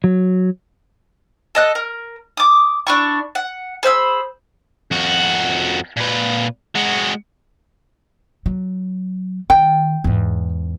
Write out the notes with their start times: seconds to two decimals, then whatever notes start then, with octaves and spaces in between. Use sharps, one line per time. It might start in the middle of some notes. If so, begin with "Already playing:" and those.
0.04 F#3
1.55 A4 D#5 F#6
1.75 A#4
2.37 D6 D#6
2.87 D4 E4 C#6
3.35 F#5
3.83 G#4 C5 B5 E6
4.91 F2 F#4
5.97 A#2 B4
6.75 G#3 F#4
8.46 F#3
9.50 D#3 G5
10.04 E2 G#2